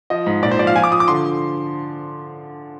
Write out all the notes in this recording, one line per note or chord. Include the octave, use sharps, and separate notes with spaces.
F3 D#5
G#2
A#2 D5
C5
F3 D5
F5
F3 G#5
D6
F3 D#6
D6
D3 C6